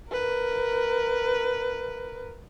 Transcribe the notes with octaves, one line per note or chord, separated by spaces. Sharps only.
A#4 B4